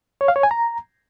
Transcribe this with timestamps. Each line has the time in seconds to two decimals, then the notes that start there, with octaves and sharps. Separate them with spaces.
0.21 C#5
0.28 F5
0.36 C#5
0.43 G#5
0.51 A#5